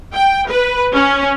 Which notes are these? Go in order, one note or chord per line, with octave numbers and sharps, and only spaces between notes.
G5
B4
C#4